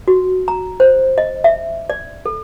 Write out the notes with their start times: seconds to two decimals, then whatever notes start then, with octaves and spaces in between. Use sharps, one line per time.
0.08 F#4
0.48 A#5
0.80 C5
1.18 D#5
1.44 E5
1.90 D5
2.26 A4